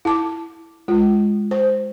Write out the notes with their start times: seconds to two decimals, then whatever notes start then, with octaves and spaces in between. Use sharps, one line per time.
0.05 E4 A5 D6
0.88 G#3 F4
1.51 C5